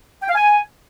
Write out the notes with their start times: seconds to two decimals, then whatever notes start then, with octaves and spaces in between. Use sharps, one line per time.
0.23 G5
0.29 F5
0.35 G#5